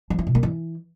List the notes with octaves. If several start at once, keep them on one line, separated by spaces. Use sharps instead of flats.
F3
E4
B2
A#3
E3